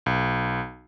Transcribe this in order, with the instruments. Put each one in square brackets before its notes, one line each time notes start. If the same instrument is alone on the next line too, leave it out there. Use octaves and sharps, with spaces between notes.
[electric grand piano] B1